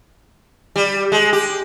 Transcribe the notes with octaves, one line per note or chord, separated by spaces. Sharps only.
G3
G#3
G4